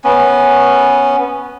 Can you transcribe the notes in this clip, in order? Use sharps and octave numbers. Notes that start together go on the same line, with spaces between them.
B3 C#4